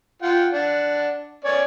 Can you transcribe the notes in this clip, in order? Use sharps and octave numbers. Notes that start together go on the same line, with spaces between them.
F4 F#5 G5
D4 F#5
C#4 C#5 D5